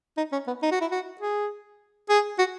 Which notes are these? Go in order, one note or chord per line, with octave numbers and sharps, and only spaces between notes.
D#4
C#4
B3
D#4
F#4
E4
F#4
G#4
G#4
F#4